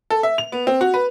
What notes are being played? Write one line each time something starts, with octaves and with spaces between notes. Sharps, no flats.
A4
E5
F7
B3
C4
F#4
B4